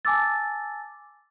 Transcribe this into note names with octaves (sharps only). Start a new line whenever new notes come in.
G#5 A5 D6 E6 A6